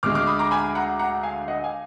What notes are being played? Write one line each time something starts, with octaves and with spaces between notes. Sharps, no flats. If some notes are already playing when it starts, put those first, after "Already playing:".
D2 D3 G#3 D6 F6
D6 F6
B5 D#6
A#5 D6
G#5 B5
F#5 A#5
F#5 A#5
F5 G#5
D#5 F#5
F5 G#5